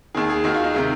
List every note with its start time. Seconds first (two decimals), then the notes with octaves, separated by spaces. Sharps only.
0.15 D#2 D#3 G#4
0.30 G#4
0.44 D#2 D#3 F#4
0.54 F4
0.64 D#4
0.74 C3 D#3 G#3